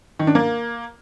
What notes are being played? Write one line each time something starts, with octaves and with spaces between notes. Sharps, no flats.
D#3
D4
A#3